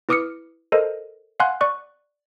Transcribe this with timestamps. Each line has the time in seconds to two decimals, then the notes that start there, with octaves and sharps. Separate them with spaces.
0.09 E4 B4 D6 D#6 F6 C#7
0.72 A4 A#4 C5 D#5
1.40 F5 F#5 G#5 C6 F#6
1.61 D5 C#6 F#6